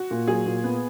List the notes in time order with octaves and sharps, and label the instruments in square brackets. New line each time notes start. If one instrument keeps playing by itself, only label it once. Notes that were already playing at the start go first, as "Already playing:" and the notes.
Already playing: [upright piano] F#4
[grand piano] A#2
[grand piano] F#3 [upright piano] G#4
[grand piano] A#2
B3